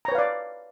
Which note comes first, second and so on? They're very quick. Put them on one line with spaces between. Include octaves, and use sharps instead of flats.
A#5 C#5 B4 F5 D5